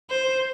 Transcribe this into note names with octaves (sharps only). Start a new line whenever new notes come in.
C5